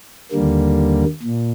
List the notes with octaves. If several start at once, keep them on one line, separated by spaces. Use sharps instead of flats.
D#2 D3 G3 A#3
A#2